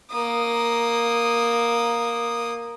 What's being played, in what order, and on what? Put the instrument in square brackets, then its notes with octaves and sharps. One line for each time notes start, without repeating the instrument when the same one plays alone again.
[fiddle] A#3 D#6